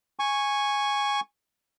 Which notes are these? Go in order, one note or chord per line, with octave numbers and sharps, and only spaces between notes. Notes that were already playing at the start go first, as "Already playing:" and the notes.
G#5 C#6